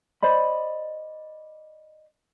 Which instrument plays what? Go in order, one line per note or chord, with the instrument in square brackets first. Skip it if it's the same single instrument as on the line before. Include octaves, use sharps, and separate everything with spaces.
[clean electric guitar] C5 D5 D#5 B5